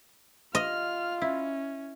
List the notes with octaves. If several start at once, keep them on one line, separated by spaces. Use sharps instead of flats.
F4 D#5 F6
C#4 E4